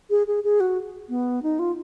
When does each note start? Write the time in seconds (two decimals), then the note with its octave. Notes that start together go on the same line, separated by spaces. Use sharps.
0.10 G#4
0.27 G#4
0.44 G#4
0.60 F#4
1.09 B3
1.43 D#4
1.59 F4